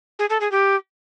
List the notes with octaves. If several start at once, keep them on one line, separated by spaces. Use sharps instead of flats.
G#4
A4
G#4
G4